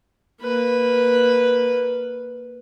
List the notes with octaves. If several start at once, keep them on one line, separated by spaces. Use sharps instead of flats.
A#3 B4